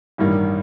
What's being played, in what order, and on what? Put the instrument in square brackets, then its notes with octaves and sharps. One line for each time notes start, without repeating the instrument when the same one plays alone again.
[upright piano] A1 G2 D#3 G3 A#3